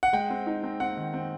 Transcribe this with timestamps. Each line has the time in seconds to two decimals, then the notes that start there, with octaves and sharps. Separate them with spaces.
0.03 F#5
0.13 G#3 G5
0.30 C4
0.46 D#4
0.63 C4
0.80 C4 F#5
0.97 D#3
1.14 C4